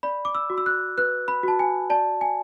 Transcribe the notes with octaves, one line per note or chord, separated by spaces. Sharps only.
D5 B5
D6
E6
F#4
E6
F#6
B4 F#6
B5
F#4 A5
G#5
D5 A5
G#5